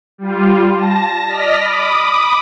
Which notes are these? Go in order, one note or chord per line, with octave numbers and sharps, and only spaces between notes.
G3 F4
A5 A#6
D5 D#5 F6 A#6 B6
B5 D6 D#6